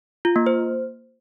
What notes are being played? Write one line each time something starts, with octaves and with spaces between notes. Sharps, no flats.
F4
A#3
C5